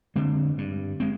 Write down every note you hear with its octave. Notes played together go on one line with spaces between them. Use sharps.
D3 G#3 C4
G2
G#3 C4